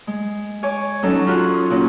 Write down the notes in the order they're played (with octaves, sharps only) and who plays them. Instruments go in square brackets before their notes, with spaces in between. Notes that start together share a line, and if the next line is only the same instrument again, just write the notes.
[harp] G#3
C#5 G#5 D6
F#3 C#4 D#4 A4
C#4 F4 F#4 G#4 F#6
D#6
A#2 C#4 F#4